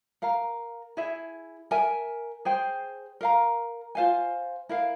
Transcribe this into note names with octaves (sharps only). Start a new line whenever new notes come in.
A#4 F5 A#5
E4 G#4 E5
A#4 E5 G#5
G#4 C5 G5
A#4 F5 A#5
F4 C5 F5 G#5
E4 A#4 F5